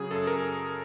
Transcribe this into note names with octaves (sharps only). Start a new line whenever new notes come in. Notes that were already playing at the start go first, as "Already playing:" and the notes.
Already playing: C#3 F#3 G#4
F#2 A4
F#2 A#4